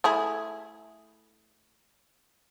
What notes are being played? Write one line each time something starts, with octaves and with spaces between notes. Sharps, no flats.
A3 E4 G#4